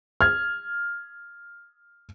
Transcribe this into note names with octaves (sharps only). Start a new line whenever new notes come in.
F6 G#6